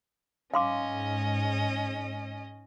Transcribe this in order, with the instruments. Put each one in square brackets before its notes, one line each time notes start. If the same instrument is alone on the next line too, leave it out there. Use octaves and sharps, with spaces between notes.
[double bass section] G#2 [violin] C#4 D#5 [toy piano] F5 C6 D6